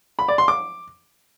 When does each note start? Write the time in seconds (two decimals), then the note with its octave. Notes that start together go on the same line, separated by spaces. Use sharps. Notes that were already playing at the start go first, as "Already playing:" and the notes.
0.19 B5
0.28 D5
0.38 C6
0.48 D6